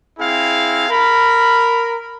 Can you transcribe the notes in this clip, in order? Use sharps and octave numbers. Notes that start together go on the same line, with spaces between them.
C4 E4 G#4 F5
A#4 B5